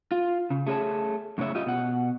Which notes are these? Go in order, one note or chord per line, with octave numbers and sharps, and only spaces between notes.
F4
C#3
A3 G#4 C#5 A5
F#2 A2 C#3 C#5 E5
F4 G4 D#5
B2 F#5